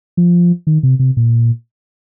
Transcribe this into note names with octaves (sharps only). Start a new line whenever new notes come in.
F3
D#3
C3
C3
A#2